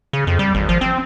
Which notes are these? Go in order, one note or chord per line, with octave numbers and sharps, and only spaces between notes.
C#3
F2
G3
G#1
F3
C4